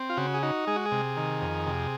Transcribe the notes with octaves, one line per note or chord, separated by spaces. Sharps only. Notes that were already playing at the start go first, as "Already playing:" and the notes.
Already playing: C4
F4
C#3 F#4
G#4
D#4 F#4
G#3 G#4
F#4
G#4
C3
D#3
F2
C3